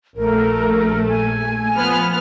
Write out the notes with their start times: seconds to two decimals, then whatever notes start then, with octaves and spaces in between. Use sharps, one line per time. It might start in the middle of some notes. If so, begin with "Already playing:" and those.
0.17 A#1 A3 A#4
1.07 G#5
1.74 F3 B3 F6